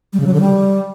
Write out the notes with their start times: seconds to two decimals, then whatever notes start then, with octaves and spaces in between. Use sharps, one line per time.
0.13 G3
0.20 C#3
0.27 F#3
0.34 D3
0.40 G3